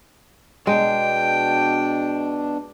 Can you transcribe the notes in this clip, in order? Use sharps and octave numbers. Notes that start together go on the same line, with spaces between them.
B2 G#3 D4 G5